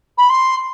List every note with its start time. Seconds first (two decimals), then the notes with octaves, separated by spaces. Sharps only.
0.18 B5
0.29 C6